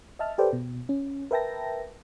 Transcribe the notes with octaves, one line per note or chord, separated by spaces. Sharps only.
D#5 E5 A5 F6
G4 A4 B4 C5 D5 G5
B2
C#4
A#4 B4 E5 G5 A5 A#6